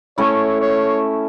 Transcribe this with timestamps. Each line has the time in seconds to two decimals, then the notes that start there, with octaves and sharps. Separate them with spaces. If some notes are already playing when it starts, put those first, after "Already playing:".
0.18 A3 C#4 E4 C#5
0.61 C#5